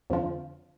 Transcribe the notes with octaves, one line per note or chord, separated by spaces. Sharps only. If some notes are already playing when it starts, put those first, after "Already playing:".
F2 D3 F3